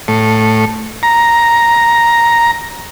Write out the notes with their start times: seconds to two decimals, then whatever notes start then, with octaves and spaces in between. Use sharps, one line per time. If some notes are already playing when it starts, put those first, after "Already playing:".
0.08 A2
1.03 A#5